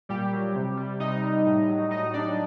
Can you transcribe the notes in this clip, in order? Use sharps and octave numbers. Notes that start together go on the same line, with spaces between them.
A#2 G3 G4
F#3
C3
G3
C3 D#4 D#5
G3
A2
F#3
A2 D#4 D#5
G3 D4 D5